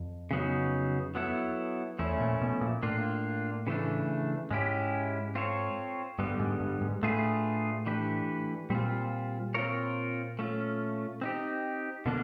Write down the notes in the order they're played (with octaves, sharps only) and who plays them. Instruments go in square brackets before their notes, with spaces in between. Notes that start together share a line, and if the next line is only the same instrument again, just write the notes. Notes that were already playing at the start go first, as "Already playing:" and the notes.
Already playing: [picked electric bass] F2
[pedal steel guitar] C#3 F#3 B3 D#4
F#3 B3 E4 A4
[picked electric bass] E2 [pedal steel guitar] F3 A3 C#4 E4
[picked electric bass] A#2
B2
A#2
[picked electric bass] A2 [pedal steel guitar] A#3 D4 F4
[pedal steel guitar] C#3 E3 A3 D4
[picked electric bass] G#2 [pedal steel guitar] G#3 C#4 E4 G4
[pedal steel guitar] C4 F4 A4 C#5
[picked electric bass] G2 [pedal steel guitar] D3 G3 B3
[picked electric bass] G#2
G2
G#2
[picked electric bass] A2 [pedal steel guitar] A3 D4 F4 G#4 B4
[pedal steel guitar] E3 A3 D4 G4 B4
[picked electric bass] A#2 [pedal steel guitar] G3 C4 F4
[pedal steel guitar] C4 F4 A#4 C#5
A3 C#4 F4
C4 D#4 G4
[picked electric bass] B2 [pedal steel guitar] D3 F3 A#3 D4